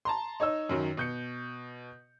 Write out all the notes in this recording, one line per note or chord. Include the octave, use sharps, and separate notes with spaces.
A5 A#5 C6
D#4 C#5 D#5 E6
F#2 D#3 F#3
B2 G6 C#7